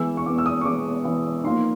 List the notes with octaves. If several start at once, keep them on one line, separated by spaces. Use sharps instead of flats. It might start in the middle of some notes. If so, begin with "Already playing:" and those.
Already playing: E3 G#3 B3 E6
C#6
E3 G#3 B3 D6
E6
D#6
C#6
E3 G#3 B3 D6
E3 G#3 B3
F3 A#3 D#4 C6